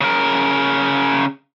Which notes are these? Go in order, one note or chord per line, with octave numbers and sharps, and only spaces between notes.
C#3 A#4